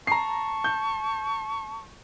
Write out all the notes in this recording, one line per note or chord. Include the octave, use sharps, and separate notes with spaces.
A5 A#5 C#6 C7
G6